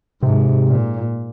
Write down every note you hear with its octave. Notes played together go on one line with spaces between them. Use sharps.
G#2 C3
A#2